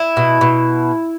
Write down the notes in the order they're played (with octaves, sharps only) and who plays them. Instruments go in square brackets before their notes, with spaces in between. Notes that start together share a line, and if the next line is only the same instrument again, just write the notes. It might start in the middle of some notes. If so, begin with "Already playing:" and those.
Already playing: [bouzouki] E4
B2
B2